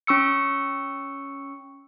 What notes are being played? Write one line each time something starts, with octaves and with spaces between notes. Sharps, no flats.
C#4 C#6 E6 C#7